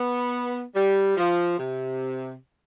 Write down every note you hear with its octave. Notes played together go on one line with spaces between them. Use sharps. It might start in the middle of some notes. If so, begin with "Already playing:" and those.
Already playing: B3
G3
F3
C3